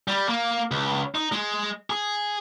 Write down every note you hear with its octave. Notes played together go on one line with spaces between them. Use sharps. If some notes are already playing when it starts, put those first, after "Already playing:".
G3
A#3
C#2
D#4
G#3
G#4